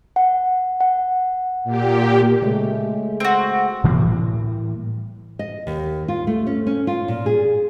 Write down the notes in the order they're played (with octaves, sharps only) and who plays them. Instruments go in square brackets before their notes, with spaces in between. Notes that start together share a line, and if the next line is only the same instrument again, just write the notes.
[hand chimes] F#5
F#5
[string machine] A#2 G4
[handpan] C#3 G#3 A3
[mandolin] C4 F#4
[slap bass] A2 E3 G3 A#3
[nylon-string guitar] D#5
D#2
F4
A3
C#4
C#4
F4
A#2
G#4